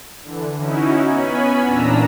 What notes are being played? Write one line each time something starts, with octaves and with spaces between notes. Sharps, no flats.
D3 E3
C#4 D#4 E4 F#4
B3 C#4 G#5 B5
E2 A#2 D4 A#5 E6